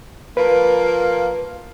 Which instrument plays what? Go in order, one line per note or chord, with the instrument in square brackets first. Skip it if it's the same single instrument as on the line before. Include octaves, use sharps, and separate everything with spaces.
[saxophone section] F3 A#3 [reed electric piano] B4